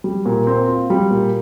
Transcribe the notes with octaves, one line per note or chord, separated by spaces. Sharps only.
G3
A#2
C4
F4
G3
A#2